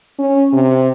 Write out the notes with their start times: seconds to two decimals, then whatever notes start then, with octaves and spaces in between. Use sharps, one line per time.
0.19 C#4
0.53 C3